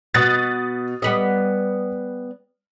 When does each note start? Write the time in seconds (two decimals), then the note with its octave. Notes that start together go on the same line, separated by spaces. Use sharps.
0.14 B2 D#6 F#6 A6
1.02 G3 B3 D#5